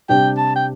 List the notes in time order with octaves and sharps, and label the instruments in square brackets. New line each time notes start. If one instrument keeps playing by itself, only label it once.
[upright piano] C3 G3 D4 G4 [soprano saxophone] G5
[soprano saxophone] A5
G5